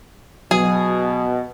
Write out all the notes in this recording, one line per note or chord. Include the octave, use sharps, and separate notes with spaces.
B2 F#3 G#4